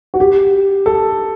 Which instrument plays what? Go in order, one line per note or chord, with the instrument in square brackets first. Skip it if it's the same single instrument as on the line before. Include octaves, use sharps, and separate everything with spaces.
[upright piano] F#4
G4
A4